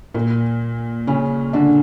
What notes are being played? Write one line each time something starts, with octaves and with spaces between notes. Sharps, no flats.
A#2 A#3
C#3 C#4
D3 D4